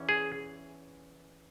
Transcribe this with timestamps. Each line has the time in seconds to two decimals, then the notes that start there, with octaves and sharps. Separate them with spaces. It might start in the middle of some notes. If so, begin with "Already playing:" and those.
Already playing: E2 E3 C#4
0.09 G#4